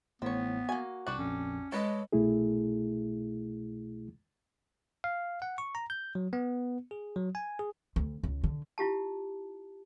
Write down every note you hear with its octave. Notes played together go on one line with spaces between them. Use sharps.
A1 A2 B3 C4 C#5
A#3 F#4 G#5
C2 D4 F#4 G4 C#6 F#6
A#1 F2 C#4
G#3 A4 B4 C#5 D#5
C2 B2 A3 E4 G#4
F5
F#5
C#6
A#5
G6
F#3
B3
G#4
F#3
G#5
G#4
D2
C#2
D3
E4 F4 G4 A5